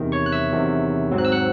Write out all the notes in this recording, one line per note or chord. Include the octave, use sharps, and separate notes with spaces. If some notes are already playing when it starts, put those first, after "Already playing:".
Already playing: E2 C3 D#3
C#5 C#6
F#6
E5 E6
E2 C3 D#3
G#1 G#2 F#3 C4
F#6
E6
F#5 F#6